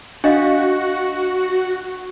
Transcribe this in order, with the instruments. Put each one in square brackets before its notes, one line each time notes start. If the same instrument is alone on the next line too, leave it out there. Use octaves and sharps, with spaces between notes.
[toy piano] D4 D#5 F5 [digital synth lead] F#4